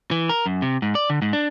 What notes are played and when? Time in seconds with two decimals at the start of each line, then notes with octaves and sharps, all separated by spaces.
0.11 E3
0.29 A#4
0.46 F#2
0.62 C3
0.82 G#2
0.95 D5
1.10 D3
1.22 G#2
1.33 D4